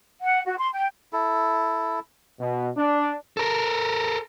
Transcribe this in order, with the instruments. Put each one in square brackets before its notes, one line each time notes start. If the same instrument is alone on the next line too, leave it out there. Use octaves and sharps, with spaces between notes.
[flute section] F#5
F#4
C6
G5
[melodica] E4 A4
[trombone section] B2
D4
[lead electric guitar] A4 A#4